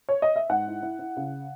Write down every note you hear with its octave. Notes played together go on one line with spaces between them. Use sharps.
C#5
D#5
E5
G#2 F#5
E4
E4
E4
C#3